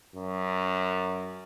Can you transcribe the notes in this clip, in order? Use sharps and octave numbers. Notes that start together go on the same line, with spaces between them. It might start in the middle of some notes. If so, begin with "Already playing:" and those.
F#2